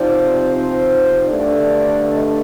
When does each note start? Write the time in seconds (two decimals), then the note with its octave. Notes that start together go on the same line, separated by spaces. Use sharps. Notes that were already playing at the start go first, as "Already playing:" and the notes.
Already playing: C3 F3 C4 D#4 D5
0.42 C5
1.27 G2 D3 A3 D4 D5
2.12 D#5